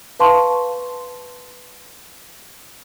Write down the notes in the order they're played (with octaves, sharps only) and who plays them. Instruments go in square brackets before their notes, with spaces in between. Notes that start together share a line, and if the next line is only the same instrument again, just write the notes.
[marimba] B4 F5 A5 C6 C#6